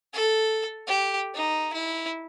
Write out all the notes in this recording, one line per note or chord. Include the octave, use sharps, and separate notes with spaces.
A4
G4
D#4
E4